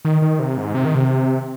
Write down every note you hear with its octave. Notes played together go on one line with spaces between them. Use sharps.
D#3
D#3
C3
G#2
C3
D#3
C3